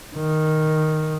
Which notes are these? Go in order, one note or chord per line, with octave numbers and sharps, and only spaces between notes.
D#3